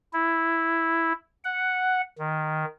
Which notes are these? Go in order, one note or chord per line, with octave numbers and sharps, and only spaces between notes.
E4
F#5
D#3